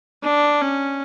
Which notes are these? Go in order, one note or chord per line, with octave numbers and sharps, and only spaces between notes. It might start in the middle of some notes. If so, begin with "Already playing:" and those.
D4
C#4